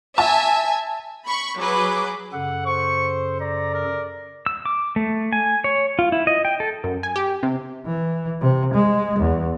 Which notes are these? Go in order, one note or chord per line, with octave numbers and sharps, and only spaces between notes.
E5 G#5 A5
B5 C#6
F#3 G#4 B4 D6
F#2 C#3 A4 F#5
C5 C#6
D5 A#5
A#4
E6
D6
A3
G#5
C#5
F4
E4
D#5
G5
A4
F#2
G#5
G4
C3
E3
C3
G#3
E2